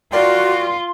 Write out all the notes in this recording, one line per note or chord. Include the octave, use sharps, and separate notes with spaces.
F4 F#4 A#4 D5 G5 C6